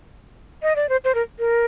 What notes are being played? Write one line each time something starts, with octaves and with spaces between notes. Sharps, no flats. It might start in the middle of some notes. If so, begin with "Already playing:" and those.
D#5
D5
C5
C5
A#4
A#4